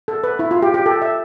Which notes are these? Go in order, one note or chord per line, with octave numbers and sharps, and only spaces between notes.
A4
B4
E4
F4
G4
G4
A4
E5